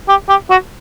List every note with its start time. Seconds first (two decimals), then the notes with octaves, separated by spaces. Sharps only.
0.08 G4
0.29 G4
0.50 F#4